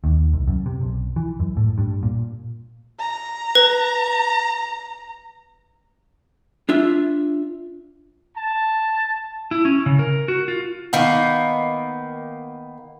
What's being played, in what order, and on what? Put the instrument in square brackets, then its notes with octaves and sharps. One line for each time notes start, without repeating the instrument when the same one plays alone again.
[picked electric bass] D#2
C2
F#2
C3
B1
E3
F#2
A2
G2
A#2
[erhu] A#5
[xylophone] B4
[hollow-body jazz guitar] D4 F4 E5
[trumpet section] A5
[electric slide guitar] E4
C#4
C#3
A#4
F#4
F4
[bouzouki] D#3 A#3 B3